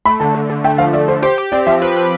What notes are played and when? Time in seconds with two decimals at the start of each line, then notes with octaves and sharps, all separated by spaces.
0.05 A3 B5
0.20 D3 A5
0.35 D3
0.49 D3
0.64 A3 G5
0.78 F3 F5
0.93 A3 D5
1.08 D3 C5
1.22 G4 C5
1.38 G4
1.52 C4 D5
1.67 F3 E5
1.82 B4 C5
1.97 B4